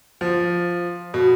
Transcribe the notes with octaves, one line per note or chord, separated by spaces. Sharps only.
F3
B2